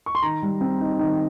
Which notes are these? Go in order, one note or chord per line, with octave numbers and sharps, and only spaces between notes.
C#6
C6
D#3 A#5
G3
C4
D#4
D#3